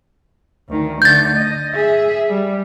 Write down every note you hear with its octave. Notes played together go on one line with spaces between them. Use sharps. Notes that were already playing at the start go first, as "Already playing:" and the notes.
D2 D#3
D3 A3 G6 A6
D#5
G#4 E5
G3